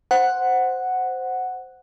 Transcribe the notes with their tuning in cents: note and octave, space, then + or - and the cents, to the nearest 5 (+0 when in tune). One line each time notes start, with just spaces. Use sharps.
C5 -5 F#5 +0